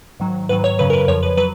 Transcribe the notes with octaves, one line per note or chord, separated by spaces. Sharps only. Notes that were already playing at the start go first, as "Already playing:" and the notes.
G#2 D#3 F#3
G#2 D#3 F#3 B4
C#5
F#2 C#3 F#3 B4
A#4
B4
F2 F3 C#5
B4
F#3 B4